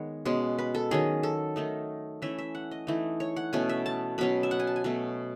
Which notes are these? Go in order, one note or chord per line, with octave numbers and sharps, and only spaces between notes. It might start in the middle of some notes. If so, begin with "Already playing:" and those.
Already playing: D#3 G#3 B3 C#5
B2 G#3 C#4
B4
A4
D#3 F#3 C#4 G#4
A4
D#3 A3 D#4
E3 A3 C#4 E5
E5
F#5
D#5
E3 A3 D#4
C#5
F#5
B2 A3 C#4 G#5
E5
A5
B2 F#3 C#4 B5
E5
F#5
G#5
A5
G#5
B2 F#3 A3